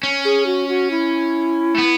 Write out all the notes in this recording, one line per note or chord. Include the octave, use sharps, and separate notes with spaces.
C#4
G#4
F#4
F#4
E4
A3
B3